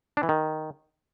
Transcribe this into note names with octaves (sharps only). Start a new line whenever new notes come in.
D4
E3
D#3